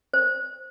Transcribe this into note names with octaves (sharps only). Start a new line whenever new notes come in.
C5